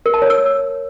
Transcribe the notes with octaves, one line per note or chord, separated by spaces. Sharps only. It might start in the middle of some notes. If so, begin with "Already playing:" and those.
A#4
A5
C#5
E6